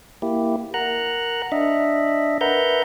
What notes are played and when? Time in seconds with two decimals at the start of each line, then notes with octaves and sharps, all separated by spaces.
0.22 A#3 E4 G4
0.74 A#4 F#5 A#5 F#6
1.52 D4 D#5 E5
2.41 A#4 B4 E5 F#5 A#5 G6